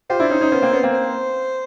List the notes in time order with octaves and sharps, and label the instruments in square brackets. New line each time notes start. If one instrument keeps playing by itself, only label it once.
[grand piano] F4 G4 [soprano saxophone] C5
[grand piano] D4 E4
C#4 D#4
C#4 D#4
B3 C#4
A#3 C4
B3 C#4
A#3 C4
[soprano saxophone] C5